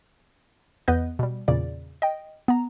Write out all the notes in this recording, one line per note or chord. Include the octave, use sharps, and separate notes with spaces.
E2 B3 B4 D#5 G6
B2 G3
E2 A#2 C#3 D5
D#5 G5
B3 A#5